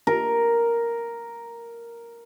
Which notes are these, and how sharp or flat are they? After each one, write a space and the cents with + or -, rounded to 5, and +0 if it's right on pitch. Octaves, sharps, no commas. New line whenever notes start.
A#4 +0